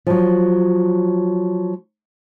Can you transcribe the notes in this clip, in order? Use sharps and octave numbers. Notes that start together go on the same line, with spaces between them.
F3 F#3